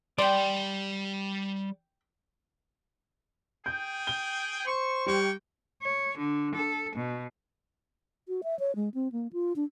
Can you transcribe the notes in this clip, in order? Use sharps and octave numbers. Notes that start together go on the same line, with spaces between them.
G3 D5 G5 C6
G#4 G5 G6
G7
C5 C#6
G3 A#3 G5 C#6
C#5
D3
A4
B2
F#4
E5
C#5
G#3
C4
A#3
F4
D4